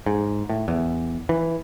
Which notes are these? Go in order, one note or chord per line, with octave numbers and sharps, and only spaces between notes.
G#2
A2
E2
E3